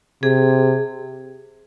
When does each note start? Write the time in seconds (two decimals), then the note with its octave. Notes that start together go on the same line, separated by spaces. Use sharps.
0.23 C3 G#4